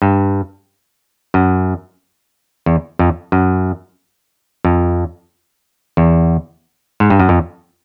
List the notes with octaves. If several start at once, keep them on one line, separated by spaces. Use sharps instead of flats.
G2
F#2
E2
F2
F#2
F2
E2
G#2
G2
F#2
F2